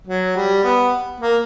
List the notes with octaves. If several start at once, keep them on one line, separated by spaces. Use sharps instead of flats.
F#3
G3
B3
A#3